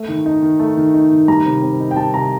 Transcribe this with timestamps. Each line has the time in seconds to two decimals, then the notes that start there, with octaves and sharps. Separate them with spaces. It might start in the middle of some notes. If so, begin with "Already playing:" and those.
Already playing: A3
0.08 D#3
0.26 D#4
0.42 D#3
0.60 A3
0.77 D#3
0.94 D#4
1.11 D#3
1.28 G3 A#5
1.45 C3
1.62 C4
1.80 D#4
1.91 G5
1.96 G3 A5
2.14 C3 A#5